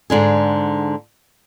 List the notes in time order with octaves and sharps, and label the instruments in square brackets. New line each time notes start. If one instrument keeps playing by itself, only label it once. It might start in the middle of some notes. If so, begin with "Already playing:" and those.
[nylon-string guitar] G#2 D3 G#4